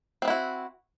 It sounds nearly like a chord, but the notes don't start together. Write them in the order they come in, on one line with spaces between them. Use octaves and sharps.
C4 B3 E4 F#4